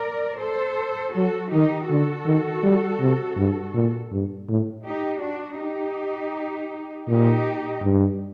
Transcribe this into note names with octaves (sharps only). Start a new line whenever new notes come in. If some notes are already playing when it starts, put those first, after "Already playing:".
Already playing: A#4 D5
A4 C5
F#3 F#4 A4
D#3 D#4 G4
D3 F#4 A4
D#3
G3
C3
G2
A#2
G2
A2
D#4 G4
D4 F#4
D#4 G4
A#2 D#4 G4
G2